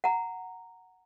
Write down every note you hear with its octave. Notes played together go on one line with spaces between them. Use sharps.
F#5 A#5